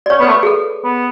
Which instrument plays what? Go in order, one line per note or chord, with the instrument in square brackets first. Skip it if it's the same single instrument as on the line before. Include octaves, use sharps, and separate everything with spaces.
[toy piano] D5
[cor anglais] C#4 [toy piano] C#5
[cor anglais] B3
[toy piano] B4
[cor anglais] A3
[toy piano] B4
G#4
A4
[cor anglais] B3